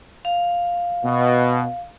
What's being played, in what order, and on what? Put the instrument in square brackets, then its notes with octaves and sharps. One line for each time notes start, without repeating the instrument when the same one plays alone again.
[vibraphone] F5
[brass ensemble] B2